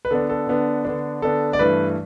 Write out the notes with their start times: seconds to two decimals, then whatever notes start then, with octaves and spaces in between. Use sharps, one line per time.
0.05 B4
0.11 D3 B3 D4 A4
0.30 A4
0.47 D3 B3 D4
0.85 D3 B3 D4
1.22 D3 B3 D4 A4
1.53 D5
1.59 G2 E3 A3 B4